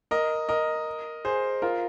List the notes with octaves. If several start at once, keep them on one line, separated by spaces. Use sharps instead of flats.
A#4 D#5
A#4 D#5
G#4 C5
F4 A#4